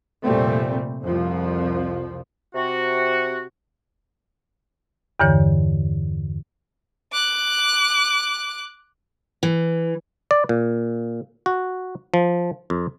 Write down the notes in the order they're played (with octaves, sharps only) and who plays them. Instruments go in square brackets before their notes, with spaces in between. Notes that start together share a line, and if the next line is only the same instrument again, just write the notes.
[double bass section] F1 A#2 G3 A3 C4
C2 F2 F3
[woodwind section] C3 F#4
[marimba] E2 G2 D3 E3 C#5
[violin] D6 F#6
[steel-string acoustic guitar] E3
[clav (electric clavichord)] D5
A#2
F#4
F3
F2